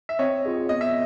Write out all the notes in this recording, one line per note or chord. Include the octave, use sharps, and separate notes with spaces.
E5
C4 C#5 D#5
F4 G#4 C#5
B3 D#5
E5